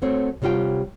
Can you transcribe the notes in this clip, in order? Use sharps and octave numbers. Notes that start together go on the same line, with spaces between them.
F#3 A3 C4 C#5
C3 F#3 G3 F4 G5